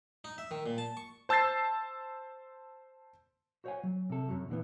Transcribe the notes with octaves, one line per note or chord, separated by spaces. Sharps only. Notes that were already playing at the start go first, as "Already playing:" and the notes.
D#4
E5
D#3
A#2
A5
C#6
C5 A5 E6 G6 A6 C7
F#4 C5 C#5 F5 F#5 G#5
F#3
C3 A4
F#2 F#3
A#2 D3 E3 B3